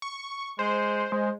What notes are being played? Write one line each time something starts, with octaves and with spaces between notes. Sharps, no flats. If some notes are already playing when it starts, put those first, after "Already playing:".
C#6
G#3 C5
G#3 C5